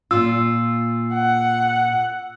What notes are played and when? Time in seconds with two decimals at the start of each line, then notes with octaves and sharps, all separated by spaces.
0.11 A#2 F4 E6
1.14 F#5